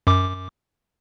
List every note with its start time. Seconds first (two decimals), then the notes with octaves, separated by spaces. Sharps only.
0.07 F#2 D6